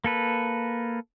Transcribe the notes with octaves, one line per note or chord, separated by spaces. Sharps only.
A#3 A4 B4